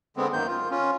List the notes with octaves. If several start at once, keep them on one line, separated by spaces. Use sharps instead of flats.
D3 G#3 B3 C4
F#2 D#3 A#3 G6
F4
C#4 F4